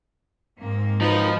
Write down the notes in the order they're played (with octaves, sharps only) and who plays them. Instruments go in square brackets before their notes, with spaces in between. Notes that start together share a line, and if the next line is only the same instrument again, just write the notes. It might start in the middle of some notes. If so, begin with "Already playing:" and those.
[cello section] G#2 A#3 C4
[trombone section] G#1 F#2 B4 [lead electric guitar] F3 [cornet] D#4